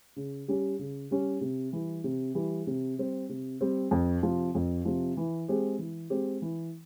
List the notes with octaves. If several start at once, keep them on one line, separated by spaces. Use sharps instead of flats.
C#3
G3 C#4 G4
C#3
G3 C#4 G4
C3
E3 G3
C3
E3 G3
C3
G3 C4
C3
G3 C4
F2
C3 F3
F2
C3 F3
E3
G#3 C4 G4
E3
G#3 C4 G4
E3